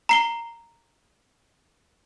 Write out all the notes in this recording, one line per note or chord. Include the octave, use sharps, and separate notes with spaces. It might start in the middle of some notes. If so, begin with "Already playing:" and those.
A#5 C7 G7